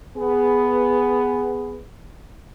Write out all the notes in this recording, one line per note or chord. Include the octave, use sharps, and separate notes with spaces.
B3 G#4